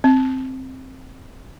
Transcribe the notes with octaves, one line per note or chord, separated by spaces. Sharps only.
C4